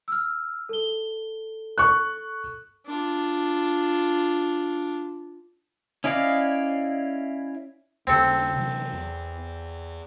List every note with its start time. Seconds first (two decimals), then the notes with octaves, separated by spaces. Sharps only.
0.08 E6 F6
0.69 A4 G7
1.78 C#6 F#6
2.87 D4 F4
6.04 C#4 E4 D5 D#5 F5
8.07 D#2 C#3 C4 A4
8.56 C3 E3 F#3
8.92 E2